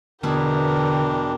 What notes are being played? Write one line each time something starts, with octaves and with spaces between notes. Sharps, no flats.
E2 B2 D3 D4 E4 A#4 G5